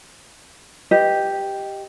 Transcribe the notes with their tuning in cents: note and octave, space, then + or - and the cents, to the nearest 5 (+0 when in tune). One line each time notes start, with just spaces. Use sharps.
G4 +0 B4 +10 D#5 +0